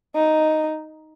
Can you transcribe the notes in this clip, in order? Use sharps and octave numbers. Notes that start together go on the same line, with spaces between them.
D#4